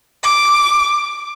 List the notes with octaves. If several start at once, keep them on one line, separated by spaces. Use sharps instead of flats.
D6